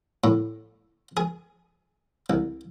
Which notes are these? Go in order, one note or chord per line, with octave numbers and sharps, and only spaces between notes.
A2
G#4
C2